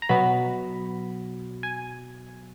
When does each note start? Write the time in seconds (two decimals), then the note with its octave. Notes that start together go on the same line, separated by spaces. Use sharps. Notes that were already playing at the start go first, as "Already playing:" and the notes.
0.02 A#5
0.09 B2 F#3 B3 B5
1.63 G#5